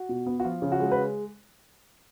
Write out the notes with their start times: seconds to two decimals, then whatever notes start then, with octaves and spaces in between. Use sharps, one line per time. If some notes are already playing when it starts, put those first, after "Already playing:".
Already playing: F#4
0.09 B2
0.26 B3
0.40 F#4
0.44 F3 F4
0.62 C#3
0.72 F#4
0.80 G#3
0.92 B4